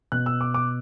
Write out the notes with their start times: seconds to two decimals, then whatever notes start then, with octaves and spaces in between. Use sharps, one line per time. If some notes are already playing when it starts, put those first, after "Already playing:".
0.12 B2 F#6
0.26 E6
0.41 D6
0.54 D6